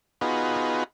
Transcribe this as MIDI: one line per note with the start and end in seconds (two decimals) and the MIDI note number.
0.21 0.84 59
0.21 0.84 63
0.21 0.84 65
0.21 0.84 66
0.21 0.84 68
0.21 0.84 71